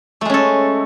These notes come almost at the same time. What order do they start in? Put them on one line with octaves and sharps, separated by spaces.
A3 G#3 C#4 A4